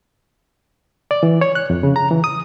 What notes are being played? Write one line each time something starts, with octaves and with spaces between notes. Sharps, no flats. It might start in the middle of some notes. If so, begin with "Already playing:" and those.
D5
E3
C#5
F#6
F2
C#3
A#5
E3
D#6